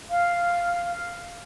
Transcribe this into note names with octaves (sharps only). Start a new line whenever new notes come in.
F5